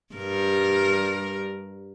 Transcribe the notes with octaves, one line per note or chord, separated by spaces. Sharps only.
G2 G3 A#4